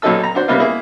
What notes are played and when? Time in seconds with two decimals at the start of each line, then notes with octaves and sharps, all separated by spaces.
0.02 B1 A#2 F#3 D#4 A4 E6
0.23 A#5
0.35 D4 F#4 C5
0.48 C3 G3 A#3 B3 D#4 F4
0.60 A#3 E4 G#4 E5